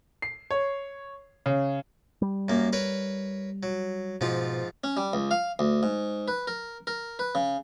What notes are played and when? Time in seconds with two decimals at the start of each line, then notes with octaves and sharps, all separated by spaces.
0.22 C7
0.51 C#5
1.46 C#3
2.22 G3
2.48 F#2 A#3
2.73 A#4 B4 C#5
3.63 F#3
4.21 G#2 B2 F3 F4
4.84 C#4
4.97 G3
5.13 C#2
5.31 F5
5.59 D2
5.83 G#2
6.28 B4
6.47 A#4
6.87 A#4
7.19 B4
7.35 C#3